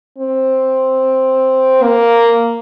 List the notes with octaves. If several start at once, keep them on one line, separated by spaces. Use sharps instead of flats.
C4
A#3